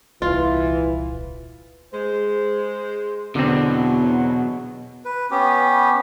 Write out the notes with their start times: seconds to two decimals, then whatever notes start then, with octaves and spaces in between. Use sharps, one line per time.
0.22 D#1 C2 E3 F4
1.93 G#3 C5
3.35 E2 B2 D3 F#3 C4
5.05 B4
5.31 B3 C#4 G4